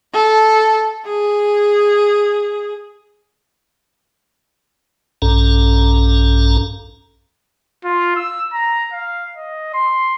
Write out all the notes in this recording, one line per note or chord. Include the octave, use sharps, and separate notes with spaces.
A4
G#4
A#1 G2 C#4 A4 A#5
F4
E6
A#5
F5
D#5
C6